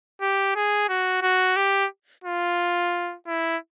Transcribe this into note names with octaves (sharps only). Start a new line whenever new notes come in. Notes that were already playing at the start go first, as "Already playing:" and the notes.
G4
G#4
F#4
F#4
G4
F4
E4